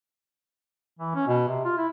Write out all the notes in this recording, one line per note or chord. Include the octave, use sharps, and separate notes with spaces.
E3
C#4
B2
C3
F4
E4